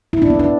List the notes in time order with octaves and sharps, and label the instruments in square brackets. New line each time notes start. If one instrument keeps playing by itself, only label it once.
[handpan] E4
D4
B3
D4